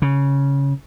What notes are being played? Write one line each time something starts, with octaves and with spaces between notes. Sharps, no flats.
C#3